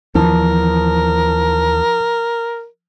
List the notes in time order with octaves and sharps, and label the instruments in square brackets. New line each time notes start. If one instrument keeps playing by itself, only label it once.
[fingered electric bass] D#2 E3 [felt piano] F3 [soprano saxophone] A#4